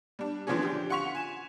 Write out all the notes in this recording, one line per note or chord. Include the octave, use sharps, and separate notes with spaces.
G3 D4
D3 E3 F3 C4 C#4 G#4
D3 G4
F4 F#5 C6 C#6 B6 F7
G#5 E7